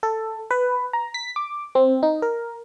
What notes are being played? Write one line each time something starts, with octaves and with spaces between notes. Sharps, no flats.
A4
B4
A#5
B6
D6
C4
D#4
A#4